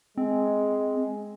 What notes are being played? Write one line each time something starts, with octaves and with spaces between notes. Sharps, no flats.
G#3 C4